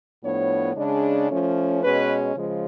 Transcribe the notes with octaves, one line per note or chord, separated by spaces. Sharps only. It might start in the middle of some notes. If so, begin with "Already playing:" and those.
A2 F3 B3 D4 C#5
C#3 G#3 D4
F3 A3 C#4
B2 G#3 C#4 B4
C#3 F3 G#3